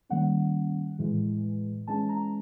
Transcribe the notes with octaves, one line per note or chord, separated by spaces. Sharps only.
D#3 G3 A#3 C#4 F#5
A2 E3 G#3
E3 G#3 C#4 A5
A#5